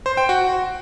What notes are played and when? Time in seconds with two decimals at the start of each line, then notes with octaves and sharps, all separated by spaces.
0.06 C5
0.17 G5
0.29 F#4